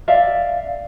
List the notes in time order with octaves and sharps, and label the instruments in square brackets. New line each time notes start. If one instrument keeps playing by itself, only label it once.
[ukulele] D5 E5 F5